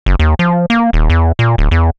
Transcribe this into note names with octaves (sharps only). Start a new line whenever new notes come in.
F#1
D#2
F3
A#3
D#1
E2
A#2
D1
E2